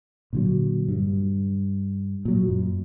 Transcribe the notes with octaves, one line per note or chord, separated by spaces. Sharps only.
A#2 D3 F#3
G2
A#2 F#3
F#2